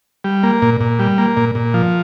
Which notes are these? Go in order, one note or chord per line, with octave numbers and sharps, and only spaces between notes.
G3
A#3
A#2
A#2
G3
A#3
A#2
A#2
F3